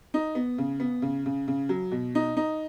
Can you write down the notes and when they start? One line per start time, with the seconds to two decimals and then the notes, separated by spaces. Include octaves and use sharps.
0.14 D#4
0.35 B3
0.58 C#3
0.80 B3
1.02 C#3
1.26 C#3
1.48 C#3
1.69 F#3
1.92 B2
2.15 D#4
2.37 D#4